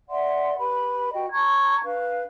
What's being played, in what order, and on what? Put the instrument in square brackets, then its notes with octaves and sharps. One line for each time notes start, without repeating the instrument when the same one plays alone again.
[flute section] D5 E5 F#5 C6
G4 B4 B5
F#4 D#5 G5
A5 A#5 C#6 G#6
D4 B4 F5